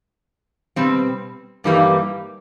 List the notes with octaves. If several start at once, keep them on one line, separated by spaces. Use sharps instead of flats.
B2 G3 C4
G2 E3 G3 A#3 D#4